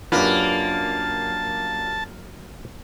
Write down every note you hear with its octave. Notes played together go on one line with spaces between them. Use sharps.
F#2 A#3 D4 F4 G4 B4 A5